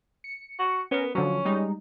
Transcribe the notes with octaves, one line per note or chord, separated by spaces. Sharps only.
C#7
F#4
B3 C#4 A#4
D3 F3 F#3 C#4
G3 G#3 D#4